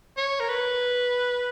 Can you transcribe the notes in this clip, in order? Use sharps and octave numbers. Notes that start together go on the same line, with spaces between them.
C#5
A#4
B4